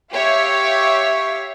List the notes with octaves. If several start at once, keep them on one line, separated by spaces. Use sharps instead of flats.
G4 C#5 E5 F5